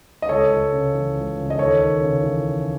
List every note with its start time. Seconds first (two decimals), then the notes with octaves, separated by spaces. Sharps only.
0.22 D#5
0.29 C#2 A4 C#5
0.51 C#2
0.72 C#3
0.94 E3
1.15 C#2
1.37 C#2
1.50 D#5
1.58 D#2 A4 C#5
1.81 D#2
2.02 C#3
2.23 E3